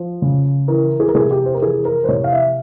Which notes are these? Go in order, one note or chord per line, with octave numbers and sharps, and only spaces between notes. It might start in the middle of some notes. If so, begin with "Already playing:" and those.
Already playing: F3
C#3
E3 A#4
G#4
A#4
C3 G#4
G4
C5
A#4
E3 G#4
A#4
C5
C3 C#5
F5
E5